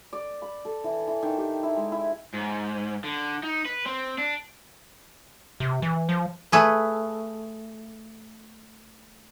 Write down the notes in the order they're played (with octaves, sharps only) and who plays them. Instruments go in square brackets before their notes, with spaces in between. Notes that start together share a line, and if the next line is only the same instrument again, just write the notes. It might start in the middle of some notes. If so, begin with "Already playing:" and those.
[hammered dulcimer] D5
B5
A4
E3
E3
D#3
G4
E4
G#3
E4
[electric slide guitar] G#2
D3
D#4
B4
C4
D4
[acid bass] C3
E3
F3
[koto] A3 G#4 B4